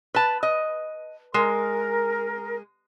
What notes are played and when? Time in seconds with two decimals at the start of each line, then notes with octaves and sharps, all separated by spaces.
0.14 B4 A5
0.43 D#5
1.34 G#3 A#4